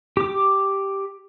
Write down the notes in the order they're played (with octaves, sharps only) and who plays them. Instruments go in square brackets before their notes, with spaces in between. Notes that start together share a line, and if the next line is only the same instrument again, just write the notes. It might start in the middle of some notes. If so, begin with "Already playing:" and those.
[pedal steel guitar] G4 D6